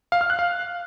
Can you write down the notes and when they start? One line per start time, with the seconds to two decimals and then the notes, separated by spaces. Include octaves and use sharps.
0.12 F5
0.21 F6
0.30 F#6
0.39 F5